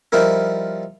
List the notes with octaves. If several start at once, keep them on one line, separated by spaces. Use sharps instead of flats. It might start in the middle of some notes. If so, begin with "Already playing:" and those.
F3 G3 D#4 E4 A#4